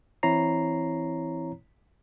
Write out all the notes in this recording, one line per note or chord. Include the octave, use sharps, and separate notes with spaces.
E3 C4 E4 C#5 A#5 C7